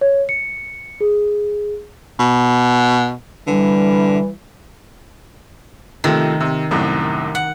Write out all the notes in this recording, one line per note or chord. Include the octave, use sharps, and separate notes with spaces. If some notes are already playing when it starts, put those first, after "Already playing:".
C#5
C#7
G#4
B2
D3 E3 G3
C3 D#3 F3 A3
C3
C2 F#2 A2
F#5